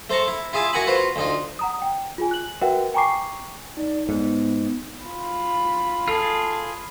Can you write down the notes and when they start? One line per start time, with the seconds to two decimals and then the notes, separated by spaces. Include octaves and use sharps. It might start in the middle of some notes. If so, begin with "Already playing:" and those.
0.10 A3 C5 A5 A#5 C#6
0.28 E4
0.53 E4 F4 G#4 E5 A5
0.73 E4 F#4 A#4 F#5 G#5 B5
0.87 F4 F#4 B4 C5 F5
1.16 D2 D#4 F4
1.59 F#5 A#5 D#6
1.82 G5
2.18 F4 G#4 G#5
2.31 F#6 F#7
2.61 F#4 A#4 B4 E5 F#5 G5
2.94 G5 G#5 A#5 C#6 D6 C7
3.77 D#4 D5
4.09 G#2 B3
5.03 F4 B5
6.08 F4 G#4 A4 A5